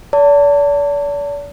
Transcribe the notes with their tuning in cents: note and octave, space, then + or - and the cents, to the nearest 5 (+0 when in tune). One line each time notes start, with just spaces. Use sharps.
D5 -40 A5 +30